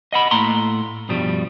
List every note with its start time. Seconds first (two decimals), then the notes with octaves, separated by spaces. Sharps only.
0.13 D#5 F#5 B5
0.31 A2 A#3 A#5 C6
1.09 G2 B2 F3 G3